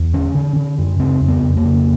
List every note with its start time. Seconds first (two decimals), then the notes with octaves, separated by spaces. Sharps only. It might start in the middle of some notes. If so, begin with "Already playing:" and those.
Already playing: E2
0.13 D3 C#4
0.35 D3
0.56 D3
0.78 F#2
1.00 C#3 C4
1.21 F2
1.28 B3
1.42 F2
1.57 A#3
1.65 C#3